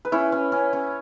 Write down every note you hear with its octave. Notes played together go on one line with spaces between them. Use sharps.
B4
C#4 E4 C#5
C#4
C#4
C#4